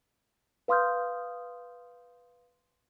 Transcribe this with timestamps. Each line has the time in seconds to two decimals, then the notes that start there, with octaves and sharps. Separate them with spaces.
0.68 B4 F5 C6 D#6 F6 G6